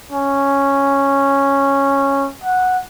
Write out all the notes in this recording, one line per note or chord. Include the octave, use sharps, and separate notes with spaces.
C#4
F#5